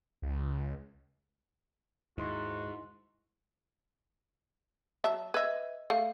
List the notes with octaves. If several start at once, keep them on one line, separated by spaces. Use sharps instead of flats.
C#2
D#2 G#2 E4 F#4 D#5 C6
F#3 E5 A5
B4 D#5 E5 E6 G#6
A3 F5